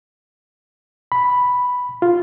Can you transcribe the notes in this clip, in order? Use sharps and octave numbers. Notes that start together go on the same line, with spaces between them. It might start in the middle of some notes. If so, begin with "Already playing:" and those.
B5
F4